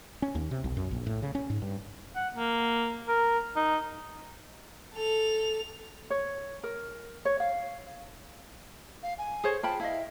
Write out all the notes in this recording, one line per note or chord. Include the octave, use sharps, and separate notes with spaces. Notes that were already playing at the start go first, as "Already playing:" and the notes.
C#4
D#2
C3
B1
F#2
A#1
A2
C#3
C#4
G#2
G2
F#5
A#3
A#4
D#4
A4 F7
C#5
A#4
C#5
F5
F5
G#5
G#4 C5 C#5
F4 G5 A5 B5
E4 D#5 F5